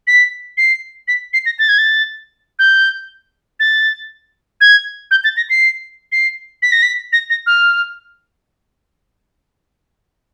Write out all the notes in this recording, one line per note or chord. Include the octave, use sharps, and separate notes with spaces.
B6
C7
B6
C7
A#6
A6
G#6
A6
G6
A6
G#6
G6
A6
A#6
C7
C7
B6
A#6
B6
A#6
A#6
F6